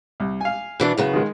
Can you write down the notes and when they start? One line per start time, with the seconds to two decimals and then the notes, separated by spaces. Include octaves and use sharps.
0.20 C2
0.41 F5 G#5
0.80 B2 E3 D4
0.97 F#2 C#3 B3
1.13 D#3 G#3